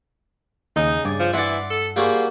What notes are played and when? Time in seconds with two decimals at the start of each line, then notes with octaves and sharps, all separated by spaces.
0.76 D#2 C#3 D#4
1.05 G2 D5 G#5
1.19 F3
1.33 E3 D5 E5 F#5 C6
1.70 A4
1.96 G3 A#3 F4 F#4 G#4 C5